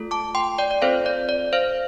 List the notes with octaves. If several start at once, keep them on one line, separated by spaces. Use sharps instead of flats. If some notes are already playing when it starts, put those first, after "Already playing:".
Already playing: A3 F4 A4
A5 D6
G5 C6
D5 G5
D5
C4 F4 A4 C5 F5
D5
D5
C5 F5